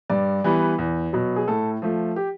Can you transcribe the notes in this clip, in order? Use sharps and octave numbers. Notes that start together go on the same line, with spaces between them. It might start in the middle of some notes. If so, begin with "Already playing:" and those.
G2 D5
E3 G3 B3
E2
B2 F#3
G#4
A2 A4
F3 A3
G4